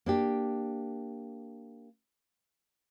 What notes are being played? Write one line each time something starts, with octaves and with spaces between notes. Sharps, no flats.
A#3 D4 G4